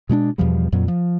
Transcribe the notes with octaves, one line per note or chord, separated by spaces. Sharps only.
B2 G#3 C#4 D4
E2 B2 F3 G3
F2 A#2 F#3
F3